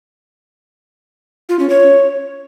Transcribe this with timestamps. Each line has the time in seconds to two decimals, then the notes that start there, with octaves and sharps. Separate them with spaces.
1.49 F4
1.59 C#4
1.70 C#5